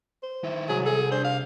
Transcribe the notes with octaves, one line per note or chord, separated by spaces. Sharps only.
C5
D#3 E4
C2 F#3 G#4
G#4 A4
D4 C5
F5